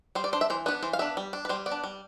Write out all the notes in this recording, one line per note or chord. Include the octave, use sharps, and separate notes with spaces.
G3 C5
D5
D4 C5
E5
E3 C5
B3 D4 B4
E3 C5
F5
B3 D4 E5
G3
D4
B4
G3 C5
B3 D5
D4
G3